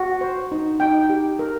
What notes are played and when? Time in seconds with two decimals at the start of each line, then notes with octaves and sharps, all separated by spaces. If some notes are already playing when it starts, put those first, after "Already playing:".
Already playing: F#4
0.21 C5
0.52 D#4
0.80 D#4 G5
1.10 G4
1.39 A#4